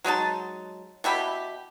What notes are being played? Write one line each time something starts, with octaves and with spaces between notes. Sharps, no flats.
F#3 G#3 D#4 A5
B2 E4 G4 B5